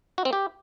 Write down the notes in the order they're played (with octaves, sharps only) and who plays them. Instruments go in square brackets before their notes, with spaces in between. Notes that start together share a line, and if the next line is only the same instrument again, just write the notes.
[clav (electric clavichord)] F#4
C4
G4